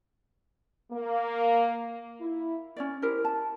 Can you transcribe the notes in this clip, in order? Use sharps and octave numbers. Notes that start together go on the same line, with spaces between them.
A#3
E4
C#4 C#5 D5
E4 G4 A#4 C5
A5